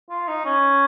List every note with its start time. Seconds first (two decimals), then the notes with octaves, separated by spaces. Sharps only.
0.10 F4
0.28 D#4
0.45 C#4